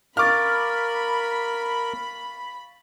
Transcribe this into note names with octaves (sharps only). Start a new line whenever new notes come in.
A#4 F5 B5 C#6 D6 F6 A6